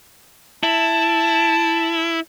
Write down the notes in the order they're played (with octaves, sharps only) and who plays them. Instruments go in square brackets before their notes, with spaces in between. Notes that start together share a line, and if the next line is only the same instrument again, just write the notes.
[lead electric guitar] E4 [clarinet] A5